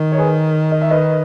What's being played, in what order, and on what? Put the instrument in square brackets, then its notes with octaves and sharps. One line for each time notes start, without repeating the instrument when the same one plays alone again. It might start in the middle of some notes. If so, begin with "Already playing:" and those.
Already playing: [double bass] D#3
[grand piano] C#5
G#4 B4
D#5
E5
B4 D#5